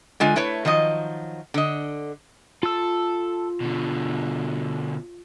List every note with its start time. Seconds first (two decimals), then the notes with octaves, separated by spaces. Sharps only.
0.20 D3 G#3 F4 G#5
0.36 A3 E4 B4 C#5
0.65 D#3 F3 F#3 D#5
1.54 D3 D#5
2.63 F4 A4 E6
3.61 B2 D3